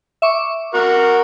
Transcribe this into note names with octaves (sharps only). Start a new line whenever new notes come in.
E5 C#6 D6
F#4 A#4